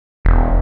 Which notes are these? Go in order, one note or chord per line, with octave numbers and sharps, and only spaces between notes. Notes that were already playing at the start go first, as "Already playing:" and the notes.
E1